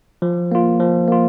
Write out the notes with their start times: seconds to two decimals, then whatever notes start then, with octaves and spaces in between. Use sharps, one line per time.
0.22 F3
0.52 A#3 F4
0.80 F3
1.08 A#3 F4